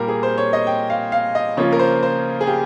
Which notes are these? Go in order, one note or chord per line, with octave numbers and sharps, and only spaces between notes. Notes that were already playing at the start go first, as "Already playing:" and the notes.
Already playing: A#2 G3 A#3 A#4
G#4
C5
C#5
D#5
G5
F5
F5
D#5
C#3 F3 A#3 F4 C#5
A#4
C5
C5
G#4
G4